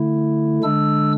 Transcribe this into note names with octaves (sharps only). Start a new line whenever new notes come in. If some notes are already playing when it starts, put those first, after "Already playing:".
Already playing: D3 A3 E4
D3 G#3 D4 E6